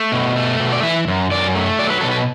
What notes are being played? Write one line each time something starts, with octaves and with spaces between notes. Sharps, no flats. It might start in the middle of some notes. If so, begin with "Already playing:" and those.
Already playing: A3
B2
A3
B2
D5
E3 E5
F#2
F#2 D5
A3
F#3 D5
B4
B2 A4
B4